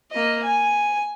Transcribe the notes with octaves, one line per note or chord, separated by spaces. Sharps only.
A#3 D#5
G#5